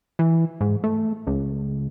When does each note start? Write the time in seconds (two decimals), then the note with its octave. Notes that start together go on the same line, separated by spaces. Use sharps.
0.19 E3
0.61 G#2
0.84 A3
1.27 C#2